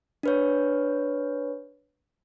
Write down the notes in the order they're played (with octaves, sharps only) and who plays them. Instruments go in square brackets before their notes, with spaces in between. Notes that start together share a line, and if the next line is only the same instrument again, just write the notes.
[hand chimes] D4 B4 C#5